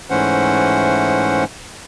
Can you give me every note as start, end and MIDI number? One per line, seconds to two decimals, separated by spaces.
0.10 1.44 44
0.10 1.44 52
0.10 1.44 57
0.10 1.44 61
0.10 1.44 72
0.10 1.44 78